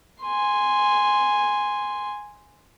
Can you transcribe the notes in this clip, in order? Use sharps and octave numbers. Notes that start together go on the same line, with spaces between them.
G#5 C6